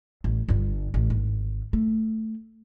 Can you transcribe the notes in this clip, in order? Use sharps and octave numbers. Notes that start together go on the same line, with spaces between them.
A1
G1 G2
A1
G#1
A3